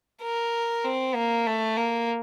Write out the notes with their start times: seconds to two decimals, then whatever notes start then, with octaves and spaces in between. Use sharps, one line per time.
0.22 A#4
0.84 C4
1.15 A#3
1.47 A3
1.77 A#3